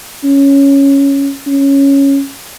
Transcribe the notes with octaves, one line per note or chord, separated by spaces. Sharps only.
C#4
C#4